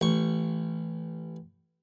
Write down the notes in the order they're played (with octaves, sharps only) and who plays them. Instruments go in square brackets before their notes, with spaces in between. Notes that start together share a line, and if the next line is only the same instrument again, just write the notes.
[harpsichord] A1 C#6